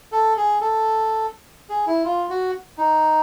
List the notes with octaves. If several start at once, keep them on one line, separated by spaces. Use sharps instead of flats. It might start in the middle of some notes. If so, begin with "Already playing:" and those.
A4
G#4
A4
G#4
E4
F4
F#4
D#4